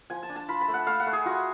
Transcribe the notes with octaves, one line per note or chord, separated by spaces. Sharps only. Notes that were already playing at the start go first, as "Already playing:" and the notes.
F3 G#5
A5
D4
A5
F4 B5
B5
A3
F#5
A3 F5
F#5
A3
G#4
F4 F#4